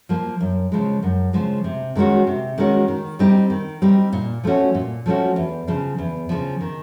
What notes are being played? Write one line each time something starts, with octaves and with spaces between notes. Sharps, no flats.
F3 A#3
F#2
C#3 F3 G#3
F#2
C#3 F3 G#3
C3
D#3 G#3 C#4 F#4
C3
D#3 G#3 C#4 F#4
D#3
G3 C4 D#4 G4
D#3
G3 C4 D#4 G4
A#2
F3 A3 C#4 F#4
A#2
F3 A3 C#4 F#4
E2
C#3 F3
E2
C#3 F3
D#3